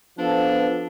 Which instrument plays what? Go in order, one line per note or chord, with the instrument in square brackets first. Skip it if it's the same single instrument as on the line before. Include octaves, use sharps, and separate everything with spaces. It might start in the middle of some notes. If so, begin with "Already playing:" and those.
[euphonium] F3 [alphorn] B3 [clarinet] D4 [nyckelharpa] A4